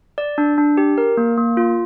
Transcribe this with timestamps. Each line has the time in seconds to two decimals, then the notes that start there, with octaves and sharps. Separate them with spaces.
0.18 D5
0.38 D4
0.58 D4
0.77 G4
0.98 A#4
1.17 A#3
1.38 A#3
1.57 F4